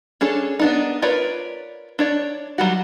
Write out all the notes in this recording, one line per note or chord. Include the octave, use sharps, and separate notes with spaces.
C#4 D4 G#4 A4 C#5
B3 D4 D#4
F4 A#4 B4 C#5 D5
D4 C#5 D5
F#3 G3 F#4